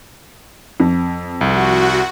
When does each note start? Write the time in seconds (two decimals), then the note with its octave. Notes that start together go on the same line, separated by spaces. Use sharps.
0.80 F2
1.41 C2 F#4